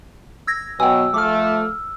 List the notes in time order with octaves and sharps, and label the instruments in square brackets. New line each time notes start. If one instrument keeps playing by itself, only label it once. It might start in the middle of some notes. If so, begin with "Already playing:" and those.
[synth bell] E6 G#6 A#6
[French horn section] B2 F#3 B3 [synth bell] G5 G#5 [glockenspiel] E6
[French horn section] F3 A3 [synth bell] D6 F6